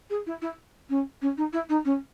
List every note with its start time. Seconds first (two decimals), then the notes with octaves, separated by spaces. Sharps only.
0.10 G#4
0.26 E4
0.42 E4
0.90 C#4
1.22 C#4
1.37 D#4
1.53 E4
1.69 D#4
1.85 C#4